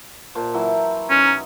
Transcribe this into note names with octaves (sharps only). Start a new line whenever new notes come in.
A#2 C5 A5
E3 F#3 E4
B2 C#4 D#4